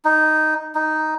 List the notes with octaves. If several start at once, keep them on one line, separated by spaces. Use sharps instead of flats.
D#4
D#4